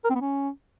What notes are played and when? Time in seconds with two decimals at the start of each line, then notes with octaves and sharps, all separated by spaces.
0.04 A#4
0.10 C4
0.15 B3
0.21 C#4